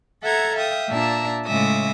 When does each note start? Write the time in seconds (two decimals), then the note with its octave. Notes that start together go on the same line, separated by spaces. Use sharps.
0.22 A4 E5 F#5 A#5 G#6
0.54 E5 F5 G5 D#6
0.88 A#2 D4 E5 A5 A#5
1.45 A2 C#3 G#3 E5 D6 D#6